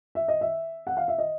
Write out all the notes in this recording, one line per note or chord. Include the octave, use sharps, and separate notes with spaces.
E5
D#5
E5
F#5
F5
E5
D#5